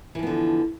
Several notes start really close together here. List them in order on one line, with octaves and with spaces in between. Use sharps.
E3 F3 B3 D3